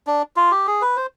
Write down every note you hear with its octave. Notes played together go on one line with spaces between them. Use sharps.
D4
F4
G4
G#4
B4
C5